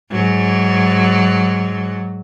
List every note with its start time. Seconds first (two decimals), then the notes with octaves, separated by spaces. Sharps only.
0.11 G#2 F#3